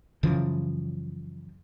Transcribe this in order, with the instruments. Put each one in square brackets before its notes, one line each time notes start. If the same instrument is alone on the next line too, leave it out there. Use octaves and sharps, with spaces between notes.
[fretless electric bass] F#2 C#3 E3 F3